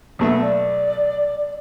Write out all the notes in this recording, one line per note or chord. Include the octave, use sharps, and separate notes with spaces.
B1 A3 B3 E5
D5